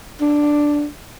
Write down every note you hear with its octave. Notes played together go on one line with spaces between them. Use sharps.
D4